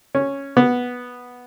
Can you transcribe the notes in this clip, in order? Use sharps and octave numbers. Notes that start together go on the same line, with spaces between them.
C#4
B3